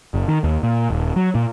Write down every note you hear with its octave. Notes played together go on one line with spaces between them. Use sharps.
F#1
D#3
D#2
A#2
D#1
F#3
A#2